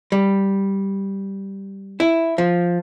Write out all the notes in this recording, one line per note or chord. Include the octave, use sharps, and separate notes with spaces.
G3
E4
F3